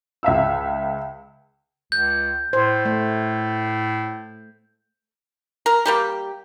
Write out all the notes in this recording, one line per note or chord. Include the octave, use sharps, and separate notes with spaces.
C#2 E5 F5 E6
C#2 G6
A2 C5
A3
A#4
G3 A#3 G4